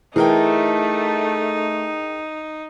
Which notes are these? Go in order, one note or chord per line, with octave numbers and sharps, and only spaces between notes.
E3 A3 D#4 G#4 A#4 G5